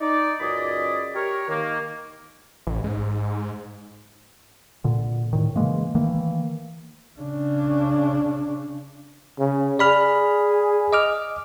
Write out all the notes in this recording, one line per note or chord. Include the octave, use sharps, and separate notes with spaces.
D#4 D5
C#2 F#2 G#4 D5 D#5 B5
G4 A#4 C#5
D#3 A#3
A1
G#2
A#2 D3
A2 D#3
C#3 E3 G#3 A#3
D#3 E3 A3 A#3
C#3 D4
C#3
G#4 D5 B5 F6
D#5 D6 F6